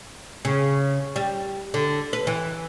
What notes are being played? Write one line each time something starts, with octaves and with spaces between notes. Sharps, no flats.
C#3
G3
D3
B4
E3